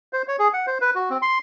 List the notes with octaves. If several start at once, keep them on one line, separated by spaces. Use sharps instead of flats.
C5
C#5
G#4
F#5
C5
B4
F#4
C4
C6